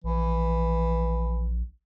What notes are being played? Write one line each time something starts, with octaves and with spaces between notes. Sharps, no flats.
A#1 E3